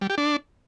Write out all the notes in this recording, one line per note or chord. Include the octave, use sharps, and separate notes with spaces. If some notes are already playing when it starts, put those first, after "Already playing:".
G3
G4
D4